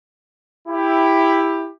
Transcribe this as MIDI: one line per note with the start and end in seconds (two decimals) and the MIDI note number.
0.68 1.70 64
0.68 1.70 67